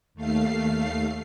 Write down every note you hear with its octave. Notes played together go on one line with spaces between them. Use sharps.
D#2 A3 F5 C7